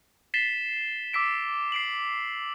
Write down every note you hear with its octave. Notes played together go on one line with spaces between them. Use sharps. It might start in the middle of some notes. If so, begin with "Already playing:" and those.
A6 B6 C7 E7 G7
D6 E6 B6 D7
C7 D7 F#7